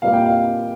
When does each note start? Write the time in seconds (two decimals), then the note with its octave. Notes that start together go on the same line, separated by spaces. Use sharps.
0.02 A#2 G3 A#3 F5
0.13 G5
0.26 F5